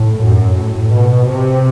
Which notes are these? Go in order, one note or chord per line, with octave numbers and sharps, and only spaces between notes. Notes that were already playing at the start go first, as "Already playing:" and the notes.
Already playing: A2
F#2
A2
B2
C3